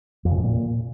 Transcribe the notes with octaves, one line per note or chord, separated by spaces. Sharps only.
F2
C#3
A2
A#2